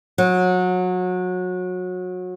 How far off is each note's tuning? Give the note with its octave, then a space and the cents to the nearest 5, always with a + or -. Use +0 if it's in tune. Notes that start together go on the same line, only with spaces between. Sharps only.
F#3 -25